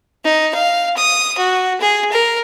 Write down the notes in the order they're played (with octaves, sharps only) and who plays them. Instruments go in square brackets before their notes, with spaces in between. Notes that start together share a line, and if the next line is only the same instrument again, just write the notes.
[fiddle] D#4
F5
D#6
F#4
G#4
A#4